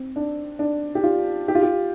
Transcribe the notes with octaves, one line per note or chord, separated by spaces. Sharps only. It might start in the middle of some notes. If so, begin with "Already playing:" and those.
Already playing: C4
D4
D4
G4
F4
G4
F4
G4